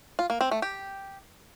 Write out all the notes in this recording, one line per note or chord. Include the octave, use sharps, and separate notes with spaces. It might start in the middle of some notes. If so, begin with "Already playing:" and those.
F4
A#3
C4
A3
G4